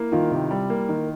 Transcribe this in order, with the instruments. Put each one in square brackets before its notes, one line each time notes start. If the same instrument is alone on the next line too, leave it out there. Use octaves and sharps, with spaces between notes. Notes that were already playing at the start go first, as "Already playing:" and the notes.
Already playing: [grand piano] A#3 [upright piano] E4
[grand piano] D#3 [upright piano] F4
[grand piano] C3
G3
A#3
D#3